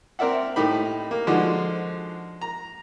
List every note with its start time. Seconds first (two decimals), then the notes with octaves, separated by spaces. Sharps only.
0.19 C4 A#4 D5 E5 F#5
0.56 A2 D#4 G4 B5
1.11 A#3
1.27 D3 F3 G#3 D#4 F#4
2.41 A#5